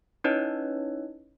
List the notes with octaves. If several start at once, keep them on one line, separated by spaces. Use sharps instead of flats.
C#4 D#4 E4 B4 C#5 D#5